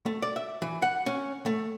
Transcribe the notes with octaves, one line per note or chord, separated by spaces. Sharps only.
A3
D5
E5
E3
F#5
C#4
A3